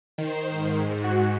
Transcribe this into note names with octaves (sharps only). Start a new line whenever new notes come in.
D#3 C5
G#2
F#4